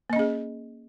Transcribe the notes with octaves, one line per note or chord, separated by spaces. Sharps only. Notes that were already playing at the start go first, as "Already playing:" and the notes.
A#3 C#4 G#4 D#5